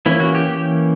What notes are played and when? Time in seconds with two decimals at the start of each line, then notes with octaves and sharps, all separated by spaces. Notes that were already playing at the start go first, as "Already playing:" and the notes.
0.06 E3 A#3 C#4 E4
0.20 F#4
0.35 G4
0.49 G4